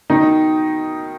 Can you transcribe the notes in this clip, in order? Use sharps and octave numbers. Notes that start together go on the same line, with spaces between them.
B2 D#3 D#4